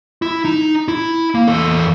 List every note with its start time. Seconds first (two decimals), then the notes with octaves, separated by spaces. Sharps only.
0.22 E4
0.45 D#4
0.88 E4
1.35 A#3
1.48 E2 A4